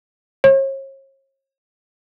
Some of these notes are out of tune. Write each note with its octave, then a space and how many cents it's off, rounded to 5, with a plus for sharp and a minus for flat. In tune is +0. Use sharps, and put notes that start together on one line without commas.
C#5 -40